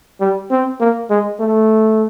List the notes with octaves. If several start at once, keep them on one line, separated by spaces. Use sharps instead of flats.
G3
C4
A#3
G#3
A3